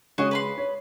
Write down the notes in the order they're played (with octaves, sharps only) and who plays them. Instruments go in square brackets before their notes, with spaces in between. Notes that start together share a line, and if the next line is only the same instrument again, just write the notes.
[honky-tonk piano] C#3 G#3 C#5 [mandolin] F#4 G#4 D#5
[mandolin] B4 B5 C6
[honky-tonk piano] C#5